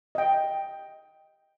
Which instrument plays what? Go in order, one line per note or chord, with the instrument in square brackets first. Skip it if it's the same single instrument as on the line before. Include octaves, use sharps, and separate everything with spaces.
[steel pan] D#5 G5